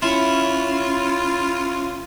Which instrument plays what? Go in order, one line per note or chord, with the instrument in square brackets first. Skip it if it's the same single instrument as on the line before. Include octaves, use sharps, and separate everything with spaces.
[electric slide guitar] C#4 [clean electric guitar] E4 [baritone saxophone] F4